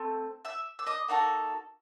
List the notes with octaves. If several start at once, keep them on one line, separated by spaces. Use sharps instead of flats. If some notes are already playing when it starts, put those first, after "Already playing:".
Already playing: A3 C4
E5 E6
E6
D#5 D#6
A#3 D#4 F#4 A4